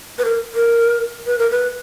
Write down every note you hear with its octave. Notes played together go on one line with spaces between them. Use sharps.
B4
A#4
A#4
B4
A#4
B4